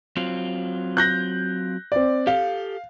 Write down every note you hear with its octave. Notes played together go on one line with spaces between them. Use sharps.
F#3 C4 F4
F#6 G6 A#6
C4 D5
G4 A4 F5